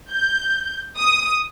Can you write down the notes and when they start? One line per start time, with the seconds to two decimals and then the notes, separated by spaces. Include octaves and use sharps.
0.12 G6
0.97 D#6